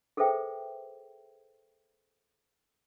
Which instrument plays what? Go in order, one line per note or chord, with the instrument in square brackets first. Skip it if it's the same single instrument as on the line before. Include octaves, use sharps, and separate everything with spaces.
[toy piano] G#4 A4 B4 C5 E5 G5